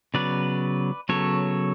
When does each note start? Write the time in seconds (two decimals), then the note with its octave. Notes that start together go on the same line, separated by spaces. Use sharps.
0.14 C#3 F#3 B3 B4 D5
1.09 C#3 F#3 B3 A4 C#5